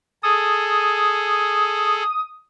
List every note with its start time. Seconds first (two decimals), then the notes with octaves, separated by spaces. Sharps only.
0.23 G#4 A4 D#6